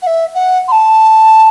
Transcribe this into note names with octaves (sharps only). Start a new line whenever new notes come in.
F#5
E5
F#5
C6
A5